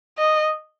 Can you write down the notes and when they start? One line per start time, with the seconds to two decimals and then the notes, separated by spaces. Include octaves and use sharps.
0.18 D#5